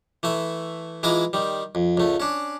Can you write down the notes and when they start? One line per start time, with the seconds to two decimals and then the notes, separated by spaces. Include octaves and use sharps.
0.23 E3 A3 E5
1.03 E3 G#3 E4 F4 A#5 D6
1.33 D#3 G3
1.75 F2
1.97 C#2 A3
2.20 C#4 D4